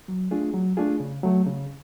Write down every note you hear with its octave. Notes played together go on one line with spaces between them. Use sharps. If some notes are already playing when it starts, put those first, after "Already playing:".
F#3
A3 D4 F4 G#4
F#3
A3 D4 F4 G#4
C#3
F#3 A3
C#3